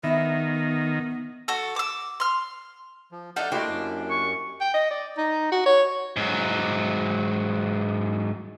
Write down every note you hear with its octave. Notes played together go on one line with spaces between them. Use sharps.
D#3 B3 E4
F#4 A4
D6 E6
C6 F6
F3
D4 D#4 A4 D5 E5 F#5 F6 G6
A3 A#3 D4 E4 F#4 G4 C5 D#5
F#2
C#6
G5
D#5
D5
D#4
F#4
C#5
G#2 F#3